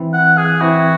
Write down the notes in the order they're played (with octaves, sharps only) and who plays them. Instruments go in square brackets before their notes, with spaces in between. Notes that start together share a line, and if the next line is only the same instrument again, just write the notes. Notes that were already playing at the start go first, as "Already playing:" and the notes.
Already playing: [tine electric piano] E3 C4 E4
[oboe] F#5
G#4
[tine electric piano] E3 C4 E4 [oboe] F#4